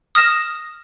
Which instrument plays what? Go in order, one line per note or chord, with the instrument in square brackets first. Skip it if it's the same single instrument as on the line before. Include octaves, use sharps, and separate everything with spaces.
[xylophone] D#6 F6 A#6 E7